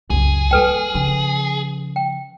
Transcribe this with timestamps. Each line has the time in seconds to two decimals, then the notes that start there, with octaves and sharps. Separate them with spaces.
0.10 C#2 F#2 G#4
0.51 D#2 G3 A4 B4 G5
0.94 C#3 F3
1.96 G5